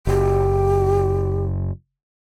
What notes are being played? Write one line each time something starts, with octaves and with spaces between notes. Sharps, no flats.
F#1 G4